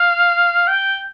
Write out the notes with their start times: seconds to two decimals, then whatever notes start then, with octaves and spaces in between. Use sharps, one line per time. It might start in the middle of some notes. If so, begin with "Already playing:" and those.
Already playing: F5
0.68 G5